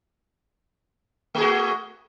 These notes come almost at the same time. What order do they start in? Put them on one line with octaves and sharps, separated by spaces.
A3 G#4 F#4